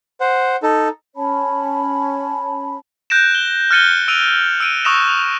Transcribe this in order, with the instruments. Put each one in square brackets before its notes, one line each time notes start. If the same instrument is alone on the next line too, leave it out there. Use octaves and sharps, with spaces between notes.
[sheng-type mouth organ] C5 F#5
D#4 A4
[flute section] C#4 C#5 A5 B5
[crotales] F#6 G6 A#6 D7 E7
G7
F6 F#6 A6 C#7 D#7 G7
E6 D7 D#7 F7
E6 D7 D#7
C#6 D#6 E6 F#6 A#6 E7